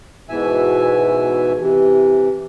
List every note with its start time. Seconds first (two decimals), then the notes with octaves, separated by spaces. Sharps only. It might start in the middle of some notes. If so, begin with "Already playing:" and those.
0.29 G#2 B2 E3 E5 G#5
1.60 C3 E3